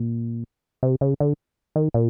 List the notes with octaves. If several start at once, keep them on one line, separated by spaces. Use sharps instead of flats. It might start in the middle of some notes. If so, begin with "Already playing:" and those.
Already playing: A#2
C3
C#3
D3
D#3
A#2